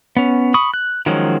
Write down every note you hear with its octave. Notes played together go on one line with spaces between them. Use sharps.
B3 C#4
B5 C#6 D#6
F#6
D#3 F3 F#3 G#3 C#4